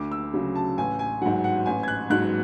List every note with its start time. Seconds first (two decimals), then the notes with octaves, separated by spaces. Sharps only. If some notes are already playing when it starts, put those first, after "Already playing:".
Already playing: D2 D6
0.11 E6
0.34 C#3 F#3
0.56 A5
0.78 A1 G#5
0.99 G#5
1.22 G#2 F#3 F#5
1.44 F#5
1.66 A1 G#5
1.83 G#6
1.88 F#6
2.10 G#2 F#3 F#6